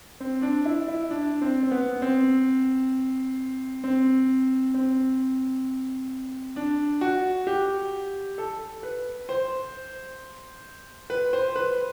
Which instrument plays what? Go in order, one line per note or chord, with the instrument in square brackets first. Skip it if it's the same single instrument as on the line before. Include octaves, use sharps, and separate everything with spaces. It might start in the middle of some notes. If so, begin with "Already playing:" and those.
[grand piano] C4
D4
E4
E4
D4
C4
C4
B3
C4
C4
C4
D4
F#4
G4
A4
B4
C5
B4
C5
B4